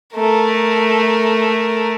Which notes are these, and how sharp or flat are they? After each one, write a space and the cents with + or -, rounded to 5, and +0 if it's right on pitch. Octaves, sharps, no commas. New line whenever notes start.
A3 +0 A#4 +0